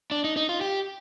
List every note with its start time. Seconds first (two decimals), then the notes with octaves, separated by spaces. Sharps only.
0.11 D4
0.24 D#4
0.37 D#4
0.49 F4
0.61 G4